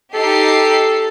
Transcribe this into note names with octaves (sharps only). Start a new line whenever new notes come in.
D#4 G4 A4 C7